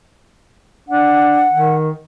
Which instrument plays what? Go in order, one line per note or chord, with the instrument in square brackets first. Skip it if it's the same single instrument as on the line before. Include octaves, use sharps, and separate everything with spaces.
[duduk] D4 [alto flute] F#5
[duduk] D#3